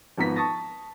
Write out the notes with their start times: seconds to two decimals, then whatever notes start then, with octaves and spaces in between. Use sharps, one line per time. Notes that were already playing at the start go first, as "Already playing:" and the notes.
0.18 G#1 F3 B3 A#5 B6
0.36 A5 C#6 D#6 A6 A#6